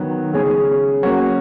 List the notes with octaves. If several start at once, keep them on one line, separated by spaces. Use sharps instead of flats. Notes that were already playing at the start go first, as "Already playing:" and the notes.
Already playing: D#3 F#3 B3
C#3 G#3 C#4 G#4
F#3 A#3 C#4 F#4